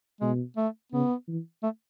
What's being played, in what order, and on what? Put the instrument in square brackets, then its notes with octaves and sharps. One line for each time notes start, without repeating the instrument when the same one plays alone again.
[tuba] B2 [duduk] G#3
[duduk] A3
[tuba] C#3 [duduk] B3
[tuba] E3
[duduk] A3